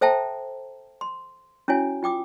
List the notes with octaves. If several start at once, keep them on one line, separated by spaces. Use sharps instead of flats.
A4 C5 E5 G5 A5 A#5
C6
C#4 E4 F#4 C#5 G#5
F4 G5 D6 D#6